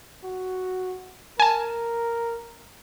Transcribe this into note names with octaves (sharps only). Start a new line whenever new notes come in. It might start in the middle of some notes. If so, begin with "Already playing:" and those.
F#4
A#4 G#5 A5